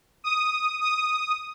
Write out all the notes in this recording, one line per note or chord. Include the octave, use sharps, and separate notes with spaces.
D#6
D#6